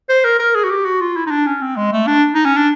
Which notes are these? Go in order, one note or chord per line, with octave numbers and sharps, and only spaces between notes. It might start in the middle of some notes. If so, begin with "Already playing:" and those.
C5
A#4
A#4
G#4
F#4
G4
F#4
F4
E4
D#4
D4
C#4
C4
G#3
A3
D4
D#4
C#4
D4